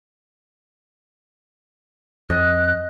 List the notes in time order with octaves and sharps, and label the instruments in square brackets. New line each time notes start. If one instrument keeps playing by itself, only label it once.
[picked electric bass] F2 [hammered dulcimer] D#5 [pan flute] F#6